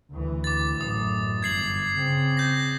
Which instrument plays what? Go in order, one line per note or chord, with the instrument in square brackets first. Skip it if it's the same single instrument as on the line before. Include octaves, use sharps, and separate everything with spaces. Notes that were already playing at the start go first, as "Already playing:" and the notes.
[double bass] D2 E3
[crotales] D6 A6
[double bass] A1 F#2 [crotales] D#6
[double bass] G1 [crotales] G#6 C7 F#7
[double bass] C#3 C4
[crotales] G6 A#6